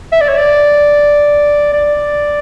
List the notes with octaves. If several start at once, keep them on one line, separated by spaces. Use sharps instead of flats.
E5
D5
C#5
D5
D5